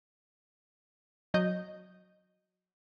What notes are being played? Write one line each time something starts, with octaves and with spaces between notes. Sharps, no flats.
F#3 D#5 G6